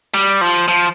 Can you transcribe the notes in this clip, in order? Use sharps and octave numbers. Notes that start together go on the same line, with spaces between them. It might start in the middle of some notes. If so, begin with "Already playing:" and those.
G3
F3
F3